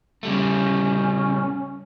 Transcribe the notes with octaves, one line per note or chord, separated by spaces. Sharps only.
C#3 G3 A3 C#4